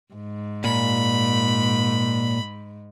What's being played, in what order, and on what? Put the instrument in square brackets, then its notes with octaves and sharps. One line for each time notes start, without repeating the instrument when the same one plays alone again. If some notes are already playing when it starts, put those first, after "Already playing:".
[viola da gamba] G#2
[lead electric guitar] A#2 [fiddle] B5